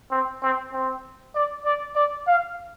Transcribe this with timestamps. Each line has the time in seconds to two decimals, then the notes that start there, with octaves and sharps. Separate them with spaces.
0.11 C4
0.42 C4
0.73 C4
1.35 D5
1.65 D5
1.96 D5
2.27 F5